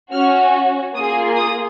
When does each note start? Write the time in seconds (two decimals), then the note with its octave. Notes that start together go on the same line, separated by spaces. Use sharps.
0.13 C#4 F#4 F6
0.95 A#3 F4 G#4 D#6
1.37 D#6